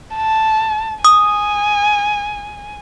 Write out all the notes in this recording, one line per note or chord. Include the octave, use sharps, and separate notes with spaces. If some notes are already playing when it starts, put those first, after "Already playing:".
A5
G#5 D#6